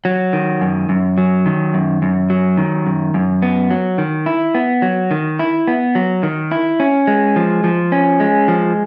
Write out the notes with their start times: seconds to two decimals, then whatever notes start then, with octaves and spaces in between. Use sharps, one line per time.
0.05 F#3
0.33 D#3
0.61 F#2
0.89 F#2
1.18 F#3
1.46 D#3
1.74 F#2
2.02 F#2
2.30 F#3
2.58 D#3
2.86 F#2
3.14 F#2
3.42 B3
3.71 F#3
3.98 D#3
4.26 E4
4.55 B3
4.82 F#3
5.11 D#3
5.39 E4
5.68 B3
5.95 F#3
6.23 D#3
6.51 E4
6.80 C#4
7.07 G#3
7.36 F3
7.64 F3
7.92 C#4
8.20 G#3
8.48 F3